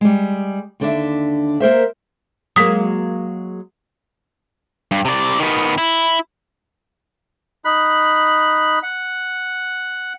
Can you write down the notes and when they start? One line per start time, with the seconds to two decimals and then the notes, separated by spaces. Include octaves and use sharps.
0.01 G3 G#3
0.80 D#2 D3 D4 E5
1.60 A#3 A#4 C5 E5
2.56 F#3 G#3 A#3 D#6 B6
4.91 G2
5.05 C3 D5
5.39 D#3 B3
5.78 E4
7.65 D#4 B5 F#6
8.83 F#5